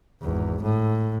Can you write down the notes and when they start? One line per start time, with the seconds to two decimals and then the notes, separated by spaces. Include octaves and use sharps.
0.21 G#1 E2
0.62 A2